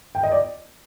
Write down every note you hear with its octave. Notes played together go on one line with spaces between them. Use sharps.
G5
D#5
D5